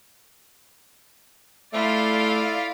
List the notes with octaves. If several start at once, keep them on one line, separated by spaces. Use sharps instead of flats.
A3 E4 F4 D5 F5